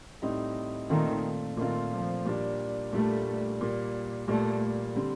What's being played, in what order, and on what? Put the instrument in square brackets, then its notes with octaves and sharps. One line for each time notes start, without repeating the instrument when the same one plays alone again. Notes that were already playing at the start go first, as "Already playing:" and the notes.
[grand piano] A2 G3 C4 D#4
[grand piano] A#2 A3 C4 F4 [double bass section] D#3
[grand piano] A#2 A3 C4 F4 [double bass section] D#3
[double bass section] F3
[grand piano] A#2 G3 D4
[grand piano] A#2 G3 D4 [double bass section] A3
[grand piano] A#2 G3 A#3
[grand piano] A#2 G3 A#3 [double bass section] A3
[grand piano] D3 G3 C4